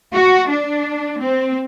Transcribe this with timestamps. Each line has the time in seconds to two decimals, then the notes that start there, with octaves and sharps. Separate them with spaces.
0.14 F#4
0.50 D4
1.21 C4